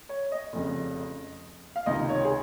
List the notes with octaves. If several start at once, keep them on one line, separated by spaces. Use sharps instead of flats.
C#5
D#5
F1 F2 C#3
F5
C#2 C3 D#3 D#5
C#5
G#4